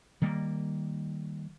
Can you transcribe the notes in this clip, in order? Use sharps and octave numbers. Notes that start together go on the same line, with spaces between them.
D#3 G3 A#3